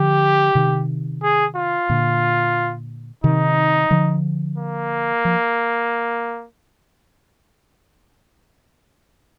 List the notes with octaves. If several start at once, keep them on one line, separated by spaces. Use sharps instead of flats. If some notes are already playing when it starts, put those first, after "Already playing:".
Already playing: D3 F3 G4
C3 D#3
G#4
F4
A#2 D3
C3 D#3 D#4
D3 F3
A#3
F3